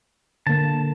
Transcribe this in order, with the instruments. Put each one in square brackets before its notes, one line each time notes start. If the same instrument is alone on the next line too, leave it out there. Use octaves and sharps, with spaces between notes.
[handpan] D3 A#3 [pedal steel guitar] A5